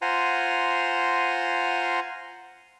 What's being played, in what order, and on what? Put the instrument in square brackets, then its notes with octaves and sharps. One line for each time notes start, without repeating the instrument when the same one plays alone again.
[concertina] F4 C5 F#5 G#5 A#5 C6